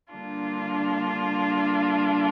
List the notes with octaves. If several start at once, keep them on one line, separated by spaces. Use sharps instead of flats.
D3 G3 A#3 D4 F4